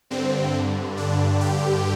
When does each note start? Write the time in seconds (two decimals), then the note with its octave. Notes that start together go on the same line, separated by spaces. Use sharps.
0.10 G2 D3 C4
0.55 G2 D3
0.97 G2 D3 D4
1.41 G2 D3 G4